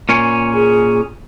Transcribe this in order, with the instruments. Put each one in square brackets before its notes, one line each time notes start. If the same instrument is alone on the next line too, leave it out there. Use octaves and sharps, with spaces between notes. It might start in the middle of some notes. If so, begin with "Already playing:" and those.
[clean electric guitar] A#2 C#4
[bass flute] G#4